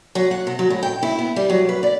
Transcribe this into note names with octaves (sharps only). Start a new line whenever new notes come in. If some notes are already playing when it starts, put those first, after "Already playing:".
F#3
F#5
C3
F#3
A2
G5
E4
B3
G3
F#3
B4
D5